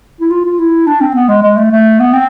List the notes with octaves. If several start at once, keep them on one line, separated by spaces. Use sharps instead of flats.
E4
F4
F4
E4
D4
C4
B3
G#3
G#3
A3
A3
B3
C4